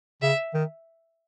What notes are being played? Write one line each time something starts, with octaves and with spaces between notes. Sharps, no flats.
C#3 E5
D#3